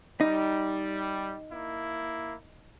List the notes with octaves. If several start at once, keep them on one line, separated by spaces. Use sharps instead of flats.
G3 D#4
A#3 E4